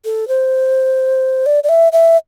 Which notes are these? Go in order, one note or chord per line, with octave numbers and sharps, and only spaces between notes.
A4
C5
D5
D5
E5
E5